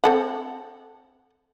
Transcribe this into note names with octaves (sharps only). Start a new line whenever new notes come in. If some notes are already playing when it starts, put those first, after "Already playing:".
C4 A4 F#5